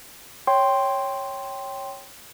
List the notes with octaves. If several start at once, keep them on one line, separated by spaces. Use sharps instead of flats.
C#5 G5 C6